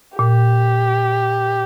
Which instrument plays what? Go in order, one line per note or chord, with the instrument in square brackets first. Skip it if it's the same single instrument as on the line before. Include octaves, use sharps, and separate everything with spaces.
[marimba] A#2 [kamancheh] G4